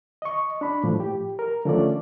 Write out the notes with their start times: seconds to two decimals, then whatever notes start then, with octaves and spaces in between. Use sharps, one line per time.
0.22 D#5 C#6
0.61 D4 B5
0.84 A2 F3
1.00 G4
1.39 A#4
1.65 D3 F3 A3 C#4 F4 D5